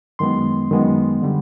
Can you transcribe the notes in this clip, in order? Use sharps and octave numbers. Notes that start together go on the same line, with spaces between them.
F#2 D#3 G#3 B3 C6
F#2 D#3 G#3 B3
D3 G3